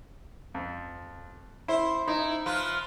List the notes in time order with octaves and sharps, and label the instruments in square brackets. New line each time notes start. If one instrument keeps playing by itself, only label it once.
[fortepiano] F2
[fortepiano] E4 [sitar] C5
[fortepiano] D#4 [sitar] E4
[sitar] F3 F4 B4